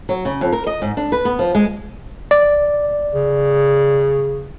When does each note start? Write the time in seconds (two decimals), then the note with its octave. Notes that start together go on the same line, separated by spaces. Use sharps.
0.09 F#3
0.25 C#3
0.41 F2
0.53 A#4
0.67 D#5
0.82 G#2
0.97 D4
1.12 B4
1.25 B3
1.39 F3
1.55 G#3
2.31 D5
3.13 C#3